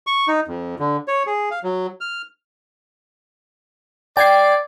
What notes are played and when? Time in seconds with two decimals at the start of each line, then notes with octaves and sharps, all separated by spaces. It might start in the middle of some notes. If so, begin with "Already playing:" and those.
0.07 C#6
0.28 D#4
0.48 F2
0.79 D3
1.08 C#5
1.27 G#4
1.51 F5
1.64 F#3
2.01 F6
4.17 D5 G5 G#6 C7